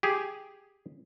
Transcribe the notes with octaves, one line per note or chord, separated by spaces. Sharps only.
G4 G#4